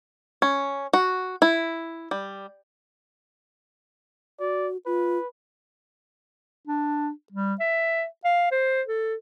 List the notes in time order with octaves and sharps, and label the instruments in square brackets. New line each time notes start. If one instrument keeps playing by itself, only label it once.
[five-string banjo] C#4
F#4
E4
G3
[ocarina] F#4 [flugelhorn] D5
[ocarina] F4 [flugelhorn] B4
[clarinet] D4
G3
E5
F5
C5
A4